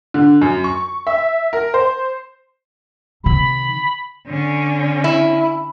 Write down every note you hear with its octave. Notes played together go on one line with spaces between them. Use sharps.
D3
F#2
C#6
E5
A#4
C5
C3 D#3 B5
D3 C#4
E4